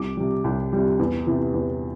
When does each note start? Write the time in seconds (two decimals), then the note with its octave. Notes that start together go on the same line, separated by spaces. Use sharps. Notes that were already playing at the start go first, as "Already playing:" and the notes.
Already playing: C2 D6
0.17 C3 G3
0.44 C2
0.73 C3 G3
0.99 E2
1.27 C3 E3
1.54 E2